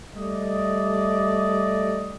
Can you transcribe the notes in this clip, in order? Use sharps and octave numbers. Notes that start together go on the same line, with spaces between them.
G3 A3 D5 D#5